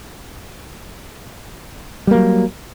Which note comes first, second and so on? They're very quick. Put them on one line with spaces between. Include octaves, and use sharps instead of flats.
G3 A#3 F#3